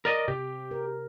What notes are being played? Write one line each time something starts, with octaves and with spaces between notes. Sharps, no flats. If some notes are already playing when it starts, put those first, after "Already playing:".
A#4 D5 D#5
C3 G4
A#4